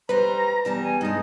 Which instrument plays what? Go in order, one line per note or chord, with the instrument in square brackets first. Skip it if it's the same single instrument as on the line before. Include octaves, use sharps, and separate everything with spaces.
[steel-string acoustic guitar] G3 C5 [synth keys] B4 [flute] A#5
[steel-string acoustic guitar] E2 G3 A5
[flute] G#5
[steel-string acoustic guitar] G2 G#3 [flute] D#4